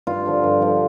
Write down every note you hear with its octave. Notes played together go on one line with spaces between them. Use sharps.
G2 F4
D3 F3
G2
D3 F3